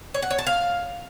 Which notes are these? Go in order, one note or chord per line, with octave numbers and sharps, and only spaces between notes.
C#5
F#5
C#5
A5
F5